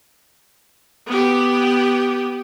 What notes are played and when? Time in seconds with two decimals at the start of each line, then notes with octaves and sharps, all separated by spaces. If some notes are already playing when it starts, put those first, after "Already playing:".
1.07 B3 G4